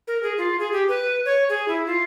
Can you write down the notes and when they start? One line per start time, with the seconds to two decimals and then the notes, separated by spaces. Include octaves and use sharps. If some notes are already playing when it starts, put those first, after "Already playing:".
0.08 A#4
0.23 G#4
0.38 F4
0.59 G#4
0.72 G4
0.88 B4
1.25 C#5
1.49 G#4
1.68 E4
1.86 F4